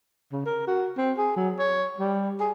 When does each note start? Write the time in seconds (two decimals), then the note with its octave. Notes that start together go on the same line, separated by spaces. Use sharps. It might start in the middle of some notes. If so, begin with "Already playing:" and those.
0.32 C#3
0.46 A#4
0.67 F#4
0.97 C4
1.18 G#4
1.36 F#3
1.59 C#5
1.98 G3
2.40 G#4